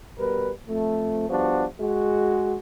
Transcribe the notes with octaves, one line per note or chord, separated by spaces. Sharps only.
B2 G3 A#4 B4
F2 A3
F3 G3 B3 D4 F#4
G#3 F#4